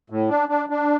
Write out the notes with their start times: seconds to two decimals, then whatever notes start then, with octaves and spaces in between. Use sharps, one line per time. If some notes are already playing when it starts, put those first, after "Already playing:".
0.10 A2
0.29 D4
0.49 D4
0.70 D4